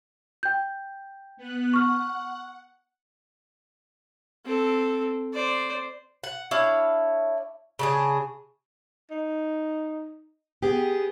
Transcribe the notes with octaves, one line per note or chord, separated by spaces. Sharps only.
G5 G6
B3 F#6
F#5 C#6 F6
C4 A4
C5 D5
F#5
D4 E4 C#5 F5
C#3 D4 G#4
D#4
B3 G4 G#4